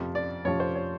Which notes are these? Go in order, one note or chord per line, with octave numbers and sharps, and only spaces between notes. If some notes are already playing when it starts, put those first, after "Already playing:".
Already playing: F2 C3 F3
D5
F2 C3 F3 C#5
C5
C#5